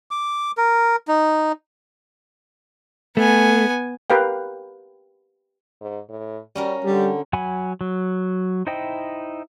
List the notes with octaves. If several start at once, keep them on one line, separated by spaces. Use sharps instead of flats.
D6
A#4
D#4
A3 B3 G#5
G4 A#4 B4 F5 G5
G#2
A2
G3 C#4 F#4 A#4
D3 G3 G4
F#3 F#5 G#5 B5
F#3
D#4 E4 C5 D#5 G5